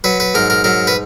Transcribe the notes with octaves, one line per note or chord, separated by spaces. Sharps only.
F#3 B4
B4
G#2 A#4
A#4
F#3 A#4
B4